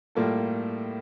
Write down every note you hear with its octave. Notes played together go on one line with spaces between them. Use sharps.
A2 G3 A#3 F4 A4